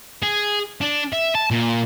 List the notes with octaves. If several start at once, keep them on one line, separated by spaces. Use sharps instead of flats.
G#4
D4
E5
A5
A#2